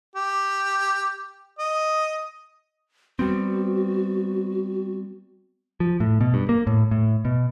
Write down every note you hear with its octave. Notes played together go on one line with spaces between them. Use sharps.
G4
D#5
G3 B3 C4 F#4
F3
A2
B2
G2
A#3
A2
A2
B2